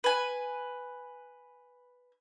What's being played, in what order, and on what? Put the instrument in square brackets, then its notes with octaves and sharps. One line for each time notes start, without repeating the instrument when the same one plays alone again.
[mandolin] B4 G#5